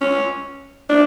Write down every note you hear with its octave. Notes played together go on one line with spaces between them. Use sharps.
C#4
D4